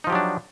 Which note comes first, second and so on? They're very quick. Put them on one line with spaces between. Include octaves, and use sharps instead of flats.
D#4 F3 G4 F#3 D4